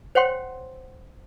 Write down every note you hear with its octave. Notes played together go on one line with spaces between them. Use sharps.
C5 C#5 F#5 G5 C6